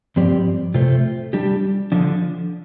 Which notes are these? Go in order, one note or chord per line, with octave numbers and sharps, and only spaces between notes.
G2 F3 C4 G4 D5
C3 A3 F4 C5
G3 D4 G4
D3 F3 D4